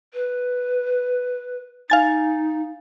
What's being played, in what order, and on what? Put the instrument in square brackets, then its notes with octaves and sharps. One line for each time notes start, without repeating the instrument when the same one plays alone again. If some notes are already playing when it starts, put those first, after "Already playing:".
[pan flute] B4
[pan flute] D#4 [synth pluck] F5 G#5 A6